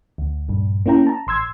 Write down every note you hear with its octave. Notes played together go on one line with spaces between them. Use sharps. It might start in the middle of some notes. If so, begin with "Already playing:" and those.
D2
A#1 G2
A#3 C#4 E4 G5 A#5
A5 A#5
A1 C6 E6 G#6